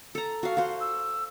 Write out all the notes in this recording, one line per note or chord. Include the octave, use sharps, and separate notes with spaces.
A4 A#5
F#4 F5
F#4 C5 F5
E6